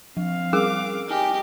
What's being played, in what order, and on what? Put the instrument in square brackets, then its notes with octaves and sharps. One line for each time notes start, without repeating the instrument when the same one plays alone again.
[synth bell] F3 [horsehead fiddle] C4 F5
[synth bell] G3 [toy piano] C#4 G#4 A#4 [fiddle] D6
[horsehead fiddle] D#4 [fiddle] G4 [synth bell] G#5 F6